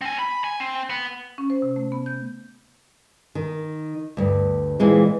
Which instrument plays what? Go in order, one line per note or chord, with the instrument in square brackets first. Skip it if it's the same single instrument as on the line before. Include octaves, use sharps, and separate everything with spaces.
[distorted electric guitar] C4 G#5
B5
G#5
C4
B3
[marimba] C#4
C5
C3
A3
B3
G6
[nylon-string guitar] D#3
D2 G2
A#2 E3 G#3 C4